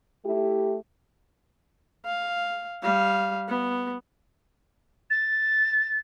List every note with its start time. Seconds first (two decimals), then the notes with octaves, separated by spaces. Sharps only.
0.24 A3 E4 G4
2.06 F5
2.83 G3 F5
3.49 B3
5.10 A6